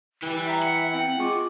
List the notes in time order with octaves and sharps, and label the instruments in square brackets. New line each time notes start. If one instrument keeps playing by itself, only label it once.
[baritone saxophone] E3 [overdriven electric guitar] G3 G4
[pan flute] E5 [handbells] G5 G#5 A#5
[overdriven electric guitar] F#5
[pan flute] C4 [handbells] G5
[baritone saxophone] G#3 [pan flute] F4 [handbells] G#5 C#6 D6